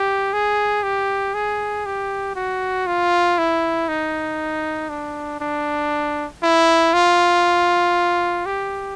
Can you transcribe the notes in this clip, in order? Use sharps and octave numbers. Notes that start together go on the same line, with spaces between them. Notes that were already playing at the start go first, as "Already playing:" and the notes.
Already playing: G4
G#4
G4
G#4
G4
F#4
F4
E4
D#4
D4
D4
E4
F4
G4